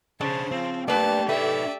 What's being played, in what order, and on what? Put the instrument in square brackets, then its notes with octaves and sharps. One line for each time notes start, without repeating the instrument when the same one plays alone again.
[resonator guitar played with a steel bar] C#3 [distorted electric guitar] D4 G#4 [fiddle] C5 [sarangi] A5
[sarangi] F3 [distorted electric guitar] C4
[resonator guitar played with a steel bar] G2 B4 D5 [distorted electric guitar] A3 A#3 [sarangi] G4 [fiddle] A5
[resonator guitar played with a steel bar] A3 [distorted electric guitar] D#4 B4 [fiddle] D5 E5